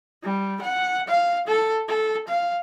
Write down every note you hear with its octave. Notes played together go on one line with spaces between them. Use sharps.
G3
F#5
F5
A4
A4
F5